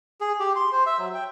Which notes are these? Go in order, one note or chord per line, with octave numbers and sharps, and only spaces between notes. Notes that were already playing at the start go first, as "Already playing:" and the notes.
G#4
G4
C6
C5
E5
F#3
G5